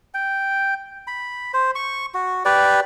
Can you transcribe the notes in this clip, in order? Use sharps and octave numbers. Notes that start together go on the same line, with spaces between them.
G5
B5
C5
C#6
F#4
G4 B4 D5